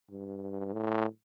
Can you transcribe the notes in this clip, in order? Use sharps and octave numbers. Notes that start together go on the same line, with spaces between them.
G2
A2